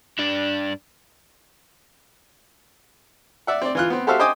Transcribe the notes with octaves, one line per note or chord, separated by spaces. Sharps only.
G2 D4
D5 E5 F#5
C4 D5
E3 F4 F#6
B3 C4
F#4 G4 A4 C5 E5 F5
C5 D#5 G5 G#5 D6 D#6